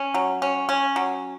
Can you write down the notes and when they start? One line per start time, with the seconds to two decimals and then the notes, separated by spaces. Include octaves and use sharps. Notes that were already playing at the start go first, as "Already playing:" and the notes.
Already playing: C#4
0.14 F#3
0.42 C#4
0.69 C#4
0.96 F#3